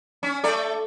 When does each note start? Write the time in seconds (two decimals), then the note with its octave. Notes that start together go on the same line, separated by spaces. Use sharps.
0.23 C#4
0.44 A3 A4 D5